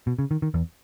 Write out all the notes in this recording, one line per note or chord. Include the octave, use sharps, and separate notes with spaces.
B2
C#3
D#3
D#3
E2